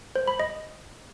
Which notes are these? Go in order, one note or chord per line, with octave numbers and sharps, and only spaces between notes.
C5
B5
D#5